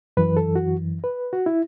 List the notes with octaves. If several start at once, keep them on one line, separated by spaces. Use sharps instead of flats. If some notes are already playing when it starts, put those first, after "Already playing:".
F#2 E3 B4
A4
F#4
B4
F#4
E4